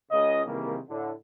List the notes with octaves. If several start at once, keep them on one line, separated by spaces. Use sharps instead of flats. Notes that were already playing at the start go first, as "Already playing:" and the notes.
C#2 C#3 D#5
C3 D#3 E3 G3 G#3 A#3
A2 D3